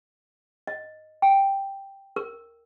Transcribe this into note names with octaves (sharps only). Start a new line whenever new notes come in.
D#5
G5
A#4